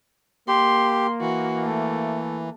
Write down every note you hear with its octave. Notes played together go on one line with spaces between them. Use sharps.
A#3 G4 C6
E3 F#4
A3